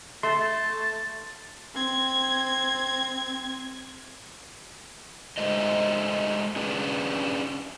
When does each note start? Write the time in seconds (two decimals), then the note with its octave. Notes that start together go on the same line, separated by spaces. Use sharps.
0.23 A3 A5 C6
1.74 C4 G#6
5.38 G#3 A3 A#4 C5 D#5
6.56 C#4 D4 G#4 B4